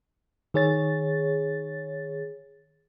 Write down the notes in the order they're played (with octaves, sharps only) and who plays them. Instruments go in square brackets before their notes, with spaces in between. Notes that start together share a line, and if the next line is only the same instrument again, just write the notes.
[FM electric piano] D#3 G#4 C#5 A6